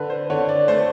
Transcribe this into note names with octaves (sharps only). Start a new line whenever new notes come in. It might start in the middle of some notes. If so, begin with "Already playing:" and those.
Already playing: D3 B4
C5
D3 C#5
D5
A3 C5